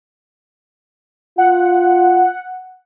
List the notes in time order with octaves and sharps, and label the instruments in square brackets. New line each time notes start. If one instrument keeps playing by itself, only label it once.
[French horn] F4 [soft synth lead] F#5